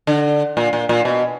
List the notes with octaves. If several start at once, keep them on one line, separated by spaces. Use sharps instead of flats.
D3
A#2
A#2
A#2
B2